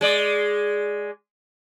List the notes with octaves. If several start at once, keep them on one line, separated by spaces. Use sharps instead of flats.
G#3 D5